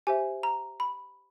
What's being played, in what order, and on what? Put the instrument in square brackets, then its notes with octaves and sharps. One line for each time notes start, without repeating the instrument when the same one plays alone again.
[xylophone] G4 C5 E5 G#5
A#5
B5